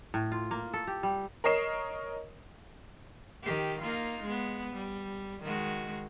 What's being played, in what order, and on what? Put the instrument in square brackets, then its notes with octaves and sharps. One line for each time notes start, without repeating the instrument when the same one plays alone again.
[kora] A2
F4
A#3
A4
G4
G3
[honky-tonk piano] A#4 C#5 D#5 C7 E7
[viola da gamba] D#3 G4
A#3 D#4 F4
G#3 B3
G3
D#3 G#3 F#4